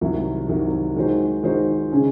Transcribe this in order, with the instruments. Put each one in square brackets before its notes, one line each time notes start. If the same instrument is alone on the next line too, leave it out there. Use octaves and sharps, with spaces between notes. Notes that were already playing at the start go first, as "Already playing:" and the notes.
[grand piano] C2 C3 D#3 F#3
C2 C3 D#3 F#3
D#3 G#3 D#4 F#4 C5
D#3 G#3 D#4 F#4 C5
C#3 G#3 C#4